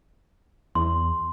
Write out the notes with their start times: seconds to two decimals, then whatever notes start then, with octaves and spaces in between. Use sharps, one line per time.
0.75 E2 C6